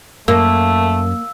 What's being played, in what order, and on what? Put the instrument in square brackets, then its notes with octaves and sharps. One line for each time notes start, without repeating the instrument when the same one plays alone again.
[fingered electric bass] F#2 [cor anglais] A3 [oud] A#3 [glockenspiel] E6